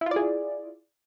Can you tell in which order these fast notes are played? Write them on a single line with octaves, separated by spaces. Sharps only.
E4 F4 D5 G#4